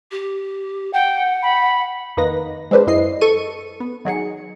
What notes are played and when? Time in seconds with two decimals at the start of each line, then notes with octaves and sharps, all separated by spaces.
0.11 G4
0.93 F#5 G5
1.43 B5
2.17 F2 D#3 A#3 D#4 B4 A#6
2.71 G#3 C4 D4 B4 C5
2.87 F#2 E4 D#5 C7
3.21 A4 C#6 D#7
3.80 B3
4.05 D#3 F#3 G#4 C#7